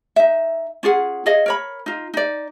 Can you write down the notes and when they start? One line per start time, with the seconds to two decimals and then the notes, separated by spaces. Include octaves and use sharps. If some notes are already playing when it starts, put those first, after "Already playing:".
0.16 D#4 E5
0.83 C#4 F4 G#4 F#5
1.26 G#4 C#5 D#5 F5
1.46 A#4 C#5 B5
1.86 D#4 F4
2.14 D#4 D5